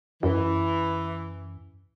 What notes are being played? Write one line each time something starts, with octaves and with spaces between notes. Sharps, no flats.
F#2 E3